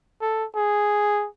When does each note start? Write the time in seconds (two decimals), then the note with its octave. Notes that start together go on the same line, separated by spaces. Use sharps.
0.21 A4
0.56 G#4